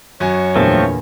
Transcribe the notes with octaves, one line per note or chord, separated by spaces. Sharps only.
F#2 F#4 C#5 G#5
E2 A#2 D3 F3 A3 C4